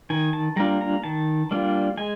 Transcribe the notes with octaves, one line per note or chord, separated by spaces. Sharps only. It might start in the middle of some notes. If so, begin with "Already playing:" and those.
D#3 G#5
A5
G3 A#3 D4 F4 A#5
A#5
D#3 A5
G3 A#3 D4 F4
G#3 G#5